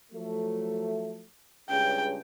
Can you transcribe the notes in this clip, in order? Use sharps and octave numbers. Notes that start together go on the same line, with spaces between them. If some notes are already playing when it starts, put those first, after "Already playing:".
F3 F#3 A3
C#2 G2 C#3 G5